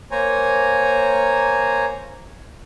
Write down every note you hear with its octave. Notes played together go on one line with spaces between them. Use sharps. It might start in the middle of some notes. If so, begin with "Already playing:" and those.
A#3 C5 C#5 G#5 A#5